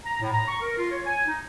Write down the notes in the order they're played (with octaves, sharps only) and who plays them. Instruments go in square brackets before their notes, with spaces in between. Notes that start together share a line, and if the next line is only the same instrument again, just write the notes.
[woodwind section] A#5
A2
A#5
C#6
A#4
F4
C#5
G#5
D#4